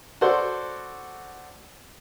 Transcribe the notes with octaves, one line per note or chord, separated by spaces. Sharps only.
F#4 A4 C5 D5